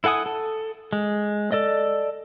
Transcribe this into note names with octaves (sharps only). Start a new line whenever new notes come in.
E4 A4 F#5 G#5 D#6
A4
G#3
A4 D5 D#5